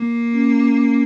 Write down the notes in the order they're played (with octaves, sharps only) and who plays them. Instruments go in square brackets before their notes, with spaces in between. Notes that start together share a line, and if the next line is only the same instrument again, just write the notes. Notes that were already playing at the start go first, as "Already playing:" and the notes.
Already playing: [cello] A#3
[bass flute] C#4